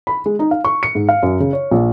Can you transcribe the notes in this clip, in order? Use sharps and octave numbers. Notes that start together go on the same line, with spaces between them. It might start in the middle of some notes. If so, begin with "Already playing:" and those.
B5
G#3
D#4
F5
C#6
C#7
G#2
F5
F#2
C#3
C#5
A#1